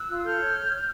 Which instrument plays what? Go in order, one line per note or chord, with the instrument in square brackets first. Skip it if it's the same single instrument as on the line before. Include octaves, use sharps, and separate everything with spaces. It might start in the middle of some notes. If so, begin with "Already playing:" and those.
Already playing: [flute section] E6 F#6
F4
A4 F6 G6
C#5